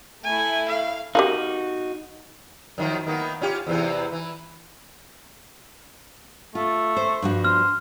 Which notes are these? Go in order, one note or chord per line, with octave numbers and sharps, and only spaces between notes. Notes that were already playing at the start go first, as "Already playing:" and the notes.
A3 E4 G#5
F5
D#4 F#4 G4 A#4 F5
F#2 D#3 F3
D#3 A#3 B3
C#4 F4 G4
E2 C3 E3
E3
A3 F4
C5
G2 F3 F#4
C5 F6